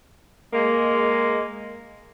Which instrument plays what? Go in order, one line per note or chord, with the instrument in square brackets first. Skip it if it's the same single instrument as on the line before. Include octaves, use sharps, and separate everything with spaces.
[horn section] G#3 A#3